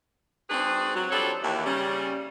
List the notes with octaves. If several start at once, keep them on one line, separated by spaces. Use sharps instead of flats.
G#2 C4 D4 F#4 G#4 B4
F#3
F3 G3 D4 A4 C#5
D#2 E3
C#3 G3 C#4